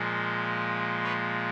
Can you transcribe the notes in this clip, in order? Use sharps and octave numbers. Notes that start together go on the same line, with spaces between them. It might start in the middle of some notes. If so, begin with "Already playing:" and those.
Already playing: A#2 F3 G#3
B4 C#5